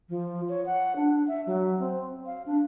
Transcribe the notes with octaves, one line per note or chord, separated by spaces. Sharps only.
F3
C#5
F#5
D4
E5
F#3
C4
F5
D4